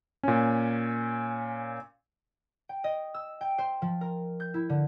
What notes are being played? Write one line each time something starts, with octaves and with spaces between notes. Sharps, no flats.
A#2 C#4
G5
D#5
E6
G5
C5
F3
A#4
G6
E4
D3